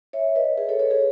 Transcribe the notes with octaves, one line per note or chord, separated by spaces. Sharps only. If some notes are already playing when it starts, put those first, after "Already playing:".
C#5 E5
B4 D#5
G#4 B4
A4 C#5
A4 C#5
G#4 B4